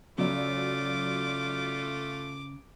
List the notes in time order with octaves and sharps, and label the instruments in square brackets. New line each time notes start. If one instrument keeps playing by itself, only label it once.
[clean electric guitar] C#3 [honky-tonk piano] F#3 D5 [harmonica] A3 F4 [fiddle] D6